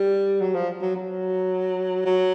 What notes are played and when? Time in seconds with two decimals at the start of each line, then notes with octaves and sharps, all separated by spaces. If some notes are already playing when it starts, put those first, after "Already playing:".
Already playing: G3
0.41 F#3
0.55 F3
0.82 F#3
0.96 F#3
2.05 F#3